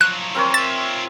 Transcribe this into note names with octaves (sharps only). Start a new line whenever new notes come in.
F3 F#3 F#6
C4 A#4 C#5
F4 E5 A6